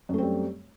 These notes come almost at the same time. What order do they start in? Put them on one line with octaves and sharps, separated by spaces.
F#2 A3 C4 G3